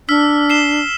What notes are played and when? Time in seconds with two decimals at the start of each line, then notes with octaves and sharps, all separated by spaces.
0.09 D4 E6 F6 B6
0.49 C7 E7 G7